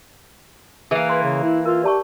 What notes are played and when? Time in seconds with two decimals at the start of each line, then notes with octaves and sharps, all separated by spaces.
0.91 E3 A#3 G#4
1.09 B4 C6
1.23 C#3
1.43 E4
1.65 F4 A#4
1.84 G4 D5 A5 C#6